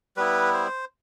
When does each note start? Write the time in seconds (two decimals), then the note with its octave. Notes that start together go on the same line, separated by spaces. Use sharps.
0.17 G3 B3 E4 B4
0.54 C5